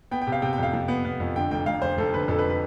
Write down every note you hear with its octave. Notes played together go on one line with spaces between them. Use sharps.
B3 G5
G5
C3
F5
C3 G5
G5
F2 F5
F3
B3
B3
F2
D3 G5
F1 G5
F1 F5
F1 C5
F1 A4
D3 B4
F2 A4
B4
B4